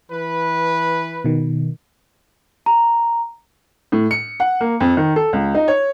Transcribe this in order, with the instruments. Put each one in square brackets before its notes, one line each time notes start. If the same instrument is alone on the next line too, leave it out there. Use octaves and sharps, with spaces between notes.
[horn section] E3 B4
[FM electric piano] B2 D#3
[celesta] A#5
[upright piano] A2
C#7
F#5
A#3
F2
D#3
A4
C#2
D#4
C#5